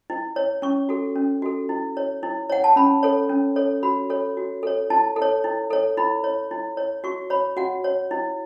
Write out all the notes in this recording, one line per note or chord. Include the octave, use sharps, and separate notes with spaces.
E4
C#5
C#4 C#6
F#4 A4
C#4
F#4 A4
E4
C#5
E4
C#5 F#5
A5
C#4 B5
A4 C#5
C#4
A4 C#5
F#4 B5
A4 C#5
F#4
A4 C#5
E4 A5
A4
C#5
E4
A4 C#5
E4 B5
C#5
E4
C#5
F#4 C#6
C#5 B5
F#4 F#5
C#5
E4